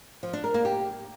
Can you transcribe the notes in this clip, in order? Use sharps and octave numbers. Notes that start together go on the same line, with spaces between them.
F3
D4
A#4
A#3
G4